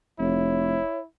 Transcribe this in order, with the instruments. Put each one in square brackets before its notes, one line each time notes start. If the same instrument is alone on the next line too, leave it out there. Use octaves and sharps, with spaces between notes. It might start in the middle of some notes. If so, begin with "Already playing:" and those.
[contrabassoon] F1 [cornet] E4 [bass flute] C#5